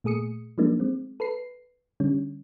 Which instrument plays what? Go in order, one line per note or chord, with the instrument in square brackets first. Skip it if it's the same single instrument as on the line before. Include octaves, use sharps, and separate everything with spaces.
[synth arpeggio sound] A#2 A3 G#4 D#6 C#7
F3 F#3 G#3 A#3 D4 D#4
G#3 C4
A4 B4 C7
D3 G3 C#4